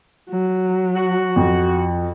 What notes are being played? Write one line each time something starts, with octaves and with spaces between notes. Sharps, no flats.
F#3
F#4
F2